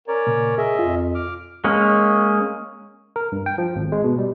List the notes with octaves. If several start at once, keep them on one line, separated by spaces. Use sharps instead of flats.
C#4 A#4 C#5 D5
A#2 C#3
C#4 G#4 D#5 E5
F2 F4
D6 F6
G#3 A#3 C#4
A#4
G2
G5
F3
G#1
G#3
B2
G3